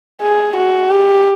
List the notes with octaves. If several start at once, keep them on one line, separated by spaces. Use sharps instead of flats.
G#4
F#4
G4